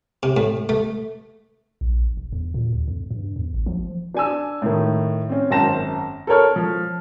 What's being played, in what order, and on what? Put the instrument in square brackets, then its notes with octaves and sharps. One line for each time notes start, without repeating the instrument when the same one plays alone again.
[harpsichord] C3
A2
A3
[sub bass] A#1
E1
E2
A#2
D2
F2
G2
E2
G#1
F3
[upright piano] D4 G#5 E6
A2 D#3
C4 C#4
G#1 F#2 C5 A5 A#6 E7
A4 A#4 C#5 F6
F3